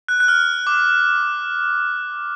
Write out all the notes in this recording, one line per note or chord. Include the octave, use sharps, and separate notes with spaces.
F#6
F#6
F6
D6